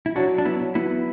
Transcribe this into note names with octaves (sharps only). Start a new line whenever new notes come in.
E4
F#3 D4 F#4
D4
B3 E4
F#3
B3 E4